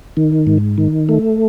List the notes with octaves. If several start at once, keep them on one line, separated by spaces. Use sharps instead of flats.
D#3
G#2
D#3
A3